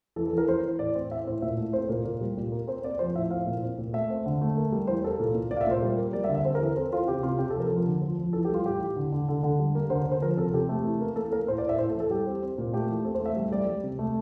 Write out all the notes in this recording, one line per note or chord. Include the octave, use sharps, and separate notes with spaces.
E3 A4
A4
E3 A#4
E3 C5
E3
A2 D5
C4
C4 E5
A2 C5
A#2 E5
A3
C4 C5
A#2 A#4
A#2
G3
A#2
A#3
C4 C5
C4 D5
F3 C5
A2 E5
C4 F5
A#2
C4
A#2
A3 E5
C4
D3
A3
A#3
G3
E3 C5
A#3 A4
A#2
A#2
A#2 D5
F5
E5
A#2 C5
G3
A#3
G3 D5
E5
D3
E5
C4 C5
A#4
E3
A#4
C4 A4
C4 F4
C3 G4
C3 F4
C3 G4
A4
F3 A#4
F3
D3
F3
F3
E3 A4
G4
G3
F4
A2 G4
E3
D3
D3
D3 A4
D3
G3
A#3
D3 C5
D3
C5
F3 A#4
C3 A4
C3 G4
A3
E3
A#3
A#3 A4
A#3 A#4
A2 C5
D5
A2
E5
A2 C5
A4
E3
A4
G3 G4
C4
C4
A#2
A3 G4
E3
C4 A4
C5
A3
E5
G3 E5
G3 D5
G3
C3
A3